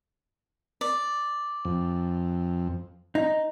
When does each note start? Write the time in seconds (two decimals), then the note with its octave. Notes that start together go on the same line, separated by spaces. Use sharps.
0.81 D5
1.65 F2
3.15 D#4